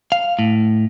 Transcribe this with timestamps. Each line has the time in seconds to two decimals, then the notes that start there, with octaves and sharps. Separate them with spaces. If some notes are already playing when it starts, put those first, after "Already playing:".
0.12 F5
0.39 A2